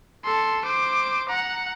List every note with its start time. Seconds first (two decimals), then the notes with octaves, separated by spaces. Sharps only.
0.24 A4 C6
0.65 C5 D6
1.29 F#5 A#5